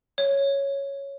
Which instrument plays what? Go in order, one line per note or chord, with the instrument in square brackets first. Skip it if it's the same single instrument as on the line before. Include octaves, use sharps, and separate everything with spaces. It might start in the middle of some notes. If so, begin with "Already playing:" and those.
[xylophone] C#5